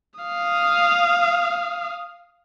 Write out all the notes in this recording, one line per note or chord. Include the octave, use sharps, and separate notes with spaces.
F5 D#6